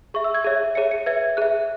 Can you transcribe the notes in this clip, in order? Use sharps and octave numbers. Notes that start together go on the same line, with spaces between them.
G#4 E5 C#6
E6
G#6
G#4 C#5 E5
G#4 C#5 E5 C#7
C#7
B4 E5 G#6
G#4 E5 F#6